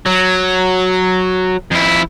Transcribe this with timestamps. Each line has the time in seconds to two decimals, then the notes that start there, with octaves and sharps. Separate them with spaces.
0.06 F#3
1.72 F2 E4